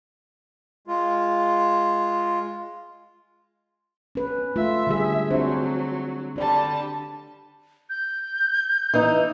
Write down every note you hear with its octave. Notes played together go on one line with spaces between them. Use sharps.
G#3 F4
C#4 B4
A3 F4 E5
D3 G3 G#4
F#3 C4 D4 C5
D3 G3 D4 D5 A5
G6
E3 D#4